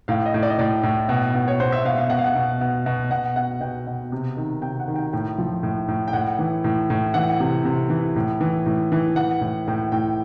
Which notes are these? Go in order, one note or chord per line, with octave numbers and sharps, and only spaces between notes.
A2 F5
D#5
A2
D5
D#5
A2 D5
A2
B2
B2
C#5
B2 C5
E5
B2 F5
F5
B2 F#5
F5
F#5
B2
B2
B2
B2 F#5
B2 F#5
B2 G5
B2
C3
D#3
C3 G5
F#5
D#3
G5
A2 G5
F3
A2
A2
G5
A2 F#5
E3
A2
A2
E3 F#5
C3
C3
E3
A2
E3
A2
E3
E3 F#5
A2
A2 G5
A2 G5